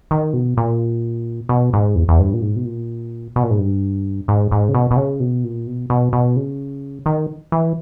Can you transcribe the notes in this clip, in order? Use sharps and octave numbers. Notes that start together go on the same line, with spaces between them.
D#3
B2
A#2
B2
G#2
E2
E2
G2
A#2
G#2
B2
A#2
B2
A#2
G#2
G2
G#2
G#2
C#3
B2
B2
C#3
B2
A#2
B2
B2
B2
C#3
D#3
E3